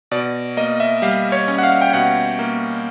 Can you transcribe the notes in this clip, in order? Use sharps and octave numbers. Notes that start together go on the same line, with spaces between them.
B2 D5
A#3 D#5
E5
G3 F5
C#5
C#4
F#5
F5
G5
B2 F#5
A#3